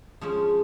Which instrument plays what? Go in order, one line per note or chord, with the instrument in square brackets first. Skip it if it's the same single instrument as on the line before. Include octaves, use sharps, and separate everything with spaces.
[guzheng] F3 G#3 C#4